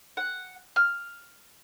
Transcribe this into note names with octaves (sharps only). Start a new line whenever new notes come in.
F#5
F6